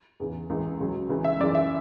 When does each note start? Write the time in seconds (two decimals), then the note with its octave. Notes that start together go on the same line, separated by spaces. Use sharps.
0.20 E2 C#3 E3
0.50 C#2 C#3 E3
0.80 C#2 C#3 F#3
1.09 C#2 C#3 E3
1.24 E5
1.40 F#2 C#3 E3 D5
1.55 E5